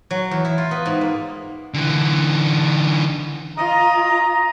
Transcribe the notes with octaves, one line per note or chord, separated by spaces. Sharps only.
F#3
E2
E4
F4
B3
G#2
A#3
D3 E3
F4 D#5 A#5 D#6